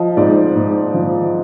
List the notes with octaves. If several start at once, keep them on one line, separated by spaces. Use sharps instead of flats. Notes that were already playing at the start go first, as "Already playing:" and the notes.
Already playing: F3 D#5
G#2 D5
G#2
F3